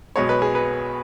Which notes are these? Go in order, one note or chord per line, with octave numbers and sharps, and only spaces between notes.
B1 B2 G#3 B3 C#5
B4
G#4
B4